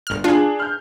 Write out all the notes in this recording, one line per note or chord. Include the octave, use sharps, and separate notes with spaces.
G1 F6
D4 F4 G#4
F6 G6